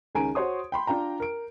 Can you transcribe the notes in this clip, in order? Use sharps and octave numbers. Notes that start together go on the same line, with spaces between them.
C#2 D#3 C#4 G#5 A#5 D7
F#4 C5 C#5 C6 D#6
G5 B5 C6
D4 F4 G5 A#5
A#4 D7